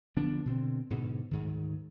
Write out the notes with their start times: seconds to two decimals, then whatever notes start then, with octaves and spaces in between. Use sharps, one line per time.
0.16 D3 F3 B3 D4
0.45 B2 D3 C4
0.90 G#2 B2 D3
1.31 D2 G#2 D#3